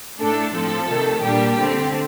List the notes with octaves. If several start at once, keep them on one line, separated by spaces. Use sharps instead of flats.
A2 A3 D4 A4
A2 F3 C4 A4
C3 D#3 A3
A#2 G3 A#3 D4 G4
D3 A3 C4